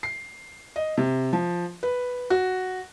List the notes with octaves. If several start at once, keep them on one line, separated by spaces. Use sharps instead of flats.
C7
D#5
C3
F3
B4
F#4